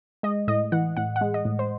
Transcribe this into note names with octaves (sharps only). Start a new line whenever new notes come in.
G#3 D#5
A2 D#5
E3 F#5
A2 F#5
F#5
G#3
D#5
A2
C5